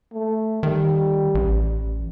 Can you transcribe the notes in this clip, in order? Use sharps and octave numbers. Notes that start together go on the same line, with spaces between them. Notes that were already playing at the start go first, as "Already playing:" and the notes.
A3
D#3 G3
A1